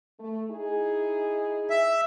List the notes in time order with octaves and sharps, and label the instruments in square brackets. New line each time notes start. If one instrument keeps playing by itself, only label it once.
[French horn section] A3
D#4 E4 G#4
[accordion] E5